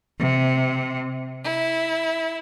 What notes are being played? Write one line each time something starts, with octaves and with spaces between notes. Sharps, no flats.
C3
E4